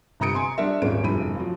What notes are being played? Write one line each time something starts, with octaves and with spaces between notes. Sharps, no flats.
G1 C3 A#5 D#6 C#7 D7
G#5 C6 D#6
G3 D4 A#4 E5
D#1 G#1 G#3 C#4 G#4 D7
F1 G2 E4 B5 D#7
F3 F#3